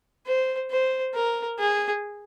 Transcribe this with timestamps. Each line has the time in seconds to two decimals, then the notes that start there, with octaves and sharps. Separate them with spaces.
0.26 C5
0.71 C5
1.14 A#4
1.59 G#4